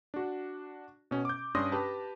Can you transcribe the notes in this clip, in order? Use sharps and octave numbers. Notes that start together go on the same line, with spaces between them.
D4 F#4
B2 C#4
D6 G6
G2 C#4 D4 C6 D#6 A#6
G4 B4 A5